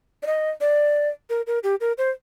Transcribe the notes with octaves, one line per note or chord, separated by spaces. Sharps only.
D5
D#5
D5
A#4
A#4
G4
A#4
C5